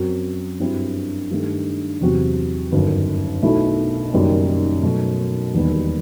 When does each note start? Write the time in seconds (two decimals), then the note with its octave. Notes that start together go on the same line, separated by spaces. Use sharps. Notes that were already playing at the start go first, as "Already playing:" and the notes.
Already playing: F#2 F#3 C4
0.60 G2 F#3 C4 E4
1.31 G2 D#3 A3
2.01 E2 C3 F#3 C4 F#4
2.72 G1 F#2 D#3
3.42 B1 B2 A3 E4
4.12 F#1 F#2 D#3 G3 B3
4.83 B2 F#3 A3
5.54 E1 D#2 D#3 G3 B3